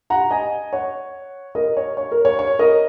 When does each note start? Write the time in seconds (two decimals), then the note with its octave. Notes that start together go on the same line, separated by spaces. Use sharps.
0.10 F#5 A#5
0.31 D#5 G#5
0.73 C#5 F#5
1.55 A#4 D#5
1.77 C#5
1.97 C#5
2.12 A#4
2.25 C#5
2.39 C#5
2.59 A#4 D#5